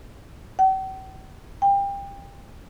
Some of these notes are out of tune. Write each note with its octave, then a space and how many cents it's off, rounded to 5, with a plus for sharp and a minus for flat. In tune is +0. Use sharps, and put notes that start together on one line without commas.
G5 -45
G5 +25